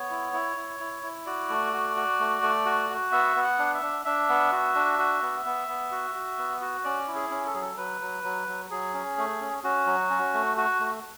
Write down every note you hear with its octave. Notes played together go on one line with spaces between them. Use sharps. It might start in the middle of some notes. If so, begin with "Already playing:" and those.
Already playing: B3 C#5
E4
E4
E4
E4
E4
F#4 D5
A3
F#4
F#4
A3
A3
F#4
F#4
B3 E5
B3
F#5
D4
E5
D4
D4 E5
B3
F#4
D4
F#4
B3
B3
B3
F#4
F#4
B3
F#4
C#4 D5
E4
G#4
C#4
A4
F#3 G#4
A4
F#3 B4
F#3
F#3
F#3
F#3 G#4
C#4
A3
C#4
C#4 F#4
F#3
C#4
A3
F#4
A3